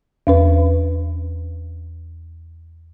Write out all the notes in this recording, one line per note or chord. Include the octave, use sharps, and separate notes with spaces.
E2 C#4 B4